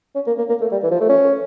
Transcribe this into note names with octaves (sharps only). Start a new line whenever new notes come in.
C#4
A#3
A#3
A#3
A3
G3
E3
F3
A3
C#4